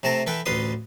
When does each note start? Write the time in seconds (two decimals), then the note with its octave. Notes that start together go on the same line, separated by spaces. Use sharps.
0.03 C3 A3 C4 A5 A#5
0.27 E3 A4 B4 G5
0.46 A1 D2 F4 B4 C6 D#6